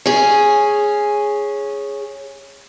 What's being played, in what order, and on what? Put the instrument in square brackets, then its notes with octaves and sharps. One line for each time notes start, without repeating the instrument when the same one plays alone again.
[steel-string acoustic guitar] C#4 G#4